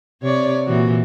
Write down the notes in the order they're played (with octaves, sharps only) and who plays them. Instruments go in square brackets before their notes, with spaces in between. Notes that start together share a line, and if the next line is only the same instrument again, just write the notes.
[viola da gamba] C3 C#5 D5
A#2 E3 F#4